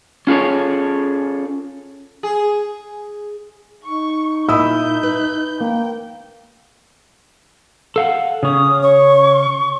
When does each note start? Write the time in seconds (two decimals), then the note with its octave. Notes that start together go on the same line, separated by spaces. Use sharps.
0.27 C#4 F4 G#4 A4 C#5
2.23 G#4
3.84 D#4 C#6
4.49 A#2 E4 D#5 B5 D#6 E6 G6
5.03 B4
5.60 A#3 G5
7.96 A4 F5 F#5
8.43 C#3 C#4 D#6
8.83 C#5 C#6